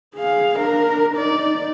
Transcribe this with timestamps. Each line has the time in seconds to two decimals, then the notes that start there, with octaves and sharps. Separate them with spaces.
0.15 G#4 F5
0.59 D4 A#4
1.14 D#4 D5